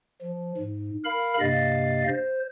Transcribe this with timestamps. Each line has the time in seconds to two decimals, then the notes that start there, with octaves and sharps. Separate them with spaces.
0.21 F3
0.57 G#2
1.05 A#4 F5 B5
1.40 G2 C3 A#3 D#5 F5 A6
2.07 C5